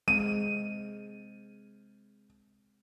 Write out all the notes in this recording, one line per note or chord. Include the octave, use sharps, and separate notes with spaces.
G#3 C4 D#7